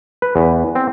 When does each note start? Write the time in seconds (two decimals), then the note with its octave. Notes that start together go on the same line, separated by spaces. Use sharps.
0.22 B4
0.36 E2
0.75 C4